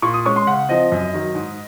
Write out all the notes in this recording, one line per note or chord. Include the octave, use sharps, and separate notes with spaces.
A#2 C#6
D#6
G#3 C#4 C#6
C6
C#3 F#5
F3 C4 D#5
F#2
D#3 F#3
G#2